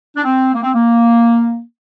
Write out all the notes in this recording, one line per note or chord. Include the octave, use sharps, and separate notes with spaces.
D4
C4
A#3
C4
A#3